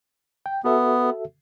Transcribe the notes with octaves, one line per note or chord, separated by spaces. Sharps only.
G5
B3 F#4 A4 E5